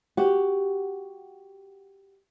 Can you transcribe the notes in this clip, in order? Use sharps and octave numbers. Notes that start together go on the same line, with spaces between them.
F#4 G4